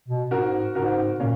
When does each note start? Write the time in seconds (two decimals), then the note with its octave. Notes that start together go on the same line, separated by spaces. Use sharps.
0.08 B2
0.31 G#2 F#4 A#4
0.75 G#2 F#4 A#4
1.20 A#2 A#3 C#4